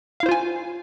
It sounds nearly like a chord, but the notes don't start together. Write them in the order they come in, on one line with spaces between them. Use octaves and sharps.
F5 E4 C5 F4 G#5